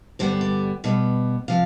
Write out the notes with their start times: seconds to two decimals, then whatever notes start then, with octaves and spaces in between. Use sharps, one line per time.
0.19 G2 D3 G3 B3 C5
0.41 D5
0.84 B2 G3 B3
1.48 C3 F3 F5